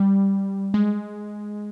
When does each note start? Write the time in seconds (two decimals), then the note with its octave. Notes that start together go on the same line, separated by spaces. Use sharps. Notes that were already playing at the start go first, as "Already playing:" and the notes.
Already playing: G3
0.74 G#3